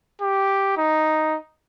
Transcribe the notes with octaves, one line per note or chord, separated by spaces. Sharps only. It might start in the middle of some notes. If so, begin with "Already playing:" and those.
G4
D#4